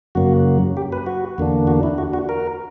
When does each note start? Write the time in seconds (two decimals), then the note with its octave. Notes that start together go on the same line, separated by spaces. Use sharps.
0.15 F#2 C#3 F#3 A#3 F#4
0.77 G4
0.92 B4
1.06 F#4
1.38 E2 D3 A#3 D4
1.67 F#4
1.83 E4
1.98 F#4
2.13 F#4
2.29 A#4